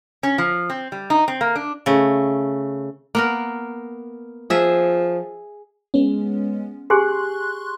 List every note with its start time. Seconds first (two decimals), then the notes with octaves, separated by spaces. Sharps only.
0.23 C#4
0.38 F3
0.70 C4
0.92 G3
1.10 D#4
1.28 C4
1.41 A#3
1.56 D4
1.86 C#3 A3
3.15 A#3 B3 A#4
4.50 F3 G#4 E5
5.94 G#3 B3 C#4
6.90 G4 G#4 G#5 C6 C#6 F#6